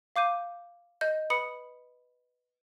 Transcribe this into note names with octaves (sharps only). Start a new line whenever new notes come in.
F5 D6 G6 D#7
D#5 G6
B4 B5 D#6 C#7